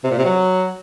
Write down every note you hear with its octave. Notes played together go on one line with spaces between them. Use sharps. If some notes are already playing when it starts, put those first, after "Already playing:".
C3
A#2
C3
F#3